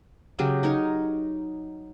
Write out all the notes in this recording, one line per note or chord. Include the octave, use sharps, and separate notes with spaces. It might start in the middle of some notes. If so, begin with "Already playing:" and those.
C#3 F#3 G4 G#4
D#4 A#4 C#5